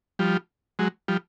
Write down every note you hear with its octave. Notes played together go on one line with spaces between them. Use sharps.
F3 G3
F#3 G#3
F3 G3